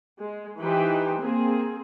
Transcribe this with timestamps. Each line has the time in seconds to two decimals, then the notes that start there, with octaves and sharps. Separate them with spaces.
0.17 G#3
0.59 E3 D#4 G4 B4 C5 G5
1.20 A#3 C4 G#4